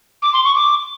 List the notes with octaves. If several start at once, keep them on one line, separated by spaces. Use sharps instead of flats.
D6
C6
C#6
D6